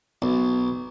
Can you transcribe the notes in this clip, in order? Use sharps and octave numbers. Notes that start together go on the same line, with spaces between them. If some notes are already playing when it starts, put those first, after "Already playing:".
B1